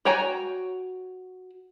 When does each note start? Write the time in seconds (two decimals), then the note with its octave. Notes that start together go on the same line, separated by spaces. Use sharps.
0.05 F#4 C#5 G5 G#5 A#5